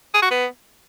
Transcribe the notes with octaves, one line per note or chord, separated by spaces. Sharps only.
G#4
F#4
B3